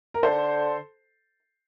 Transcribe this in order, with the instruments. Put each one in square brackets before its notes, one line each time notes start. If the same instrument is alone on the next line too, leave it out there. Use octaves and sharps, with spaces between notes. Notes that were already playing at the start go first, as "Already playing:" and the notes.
[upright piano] A#4
[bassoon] D3 [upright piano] A4 C5